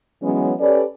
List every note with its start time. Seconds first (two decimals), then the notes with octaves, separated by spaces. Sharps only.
0.22 E3 F#3 G#3 B3 C#4
0.60 C#4 G4 A4 B4 D5